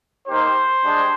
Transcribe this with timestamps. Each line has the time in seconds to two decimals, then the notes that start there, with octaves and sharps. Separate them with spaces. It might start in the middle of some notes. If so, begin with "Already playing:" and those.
0.27 A#3 D#4 G4 C5
0.83 G#3 D4 G4